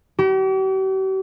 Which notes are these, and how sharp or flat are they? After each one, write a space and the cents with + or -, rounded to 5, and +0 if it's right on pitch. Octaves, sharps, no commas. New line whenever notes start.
G4 -45